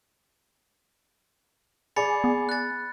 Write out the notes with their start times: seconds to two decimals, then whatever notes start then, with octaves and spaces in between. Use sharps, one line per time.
1.96 G#4 D5 B5 A6 C#7
2.24 B3
2.49 F#6 A6